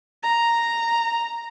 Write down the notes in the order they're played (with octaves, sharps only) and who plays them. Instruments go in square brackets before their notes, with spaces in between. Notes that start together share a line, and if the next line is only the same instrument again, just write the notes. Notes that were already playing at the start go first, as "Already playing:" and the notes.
[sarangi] A#5